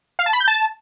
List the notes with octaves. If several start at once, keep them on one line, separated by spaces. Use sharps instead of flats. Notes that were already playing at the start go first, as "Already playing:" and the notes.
F5
A5
B5
G6
A5